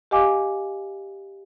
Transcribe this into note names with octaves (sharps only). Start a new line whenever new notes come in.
G4 D#5 F5 G#5 D6